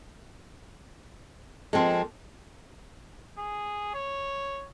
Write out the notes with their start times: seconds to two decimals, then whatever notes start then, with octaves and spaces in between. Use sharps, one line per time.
1.73 F3 G#3 A#3 C4 A4
3.39 G#4
3.94 C#5